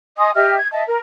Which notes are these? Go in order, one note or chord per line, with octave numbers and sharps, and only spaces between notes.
D#5 G#5 C6 D#6
G4 D#5 E5 F6
G#6
D#5 E5 A5
A#4